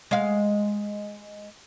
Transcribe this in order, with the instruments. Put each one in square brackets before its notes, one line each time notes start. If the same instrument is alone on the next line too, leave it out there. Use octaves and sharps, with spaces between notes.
[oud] G#3 F5